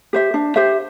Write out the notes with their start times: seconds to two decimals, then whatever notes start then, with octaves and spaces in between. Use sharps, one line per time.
0.13 G4 C5 E5
0.34 D4
0.56 G4 C5 E5